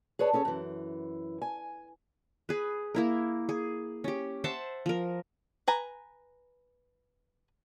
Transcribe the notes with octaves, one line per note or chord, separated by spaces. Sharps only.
G#4 B4 C#5 D5 A5
C#4 G#4 A4 C#5
F#2 E3
G#5
G#4 B4
A#3 E4 A#4
G#4
C#4 G4
C5 E5 F#5 A5
F3 A#4
B4 G#5 A#5